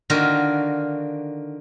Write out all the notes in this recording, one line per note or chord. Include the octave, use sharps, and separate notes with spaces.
D3 D#3 A#3 F4 F#4